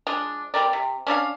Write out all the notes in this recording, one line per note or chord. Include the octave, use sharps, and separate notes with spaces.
F3 G#3 D4
G3 C4 A#4 D5
C3
C#4 D4 A4 F5